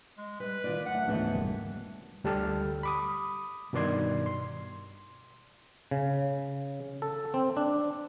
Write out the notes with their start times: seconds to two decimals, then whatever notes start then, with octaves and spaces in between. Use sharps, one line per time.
0.18 G#3
0.40 G3 B4
0.64 D#3 F4 D5
0.86 F#2 A3 F#5
1.08 D2 G#2 C#3 E3 F3 B3
1.33 F1 G3 A#3
2.24 D2 G3 G4 A4 A5 F6
2.83 B5 D6 D#6
3.73 G2 B2 D#3 D5 C6 G#6
4.26 C6
5.91 C#3
7.02 A4
7.34 C4
7.57 D4